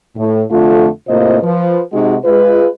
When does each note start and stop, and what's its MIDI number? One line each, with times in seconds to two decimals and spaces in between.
0.17 0.42 45
0.51 0.88 41
0.51 0.88 50
0.51 0.88 57
0.51 0.88 65
1.08 1.38 45
1.08 1.38 48
1.08 1.38 58
1.08 1.38 65
1.08 1.38 72
1.08 1.38 75
1.43 1.81 53
1.43 1.81 71
1.93 2.16 48
1.93 2.16 56
1.93 2.16 63
1.93 2.16 66
2.25 2.68 56
2.25 2.68 65
2.25 2.68 71